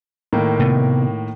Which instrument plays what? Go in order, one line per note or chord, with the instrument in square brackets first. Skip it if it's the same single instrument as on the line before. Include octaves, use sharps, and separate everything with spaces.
[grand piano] A2 D#3 A#3
[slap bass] C3 A3 B3